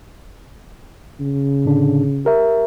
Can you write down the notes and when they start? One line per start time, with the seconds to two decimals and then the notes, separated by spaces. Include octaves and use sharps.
1.20 C#3
1.65 A2 D3 D4
2.25 G4 A#4 E5